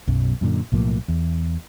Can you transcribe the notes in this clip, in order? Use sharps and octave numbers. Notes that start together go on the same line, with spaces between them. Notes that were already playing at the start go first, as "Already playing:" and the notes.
B1 F#2 B2
F#2 A#2 D3
B1 A2 F3 A#3
E2